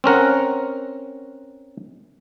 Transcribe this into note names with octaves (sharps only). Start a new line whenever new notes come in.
C4 C#4 A#4 F#5